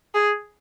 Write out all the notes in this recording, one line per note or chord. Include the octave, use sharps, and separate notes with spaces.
G#4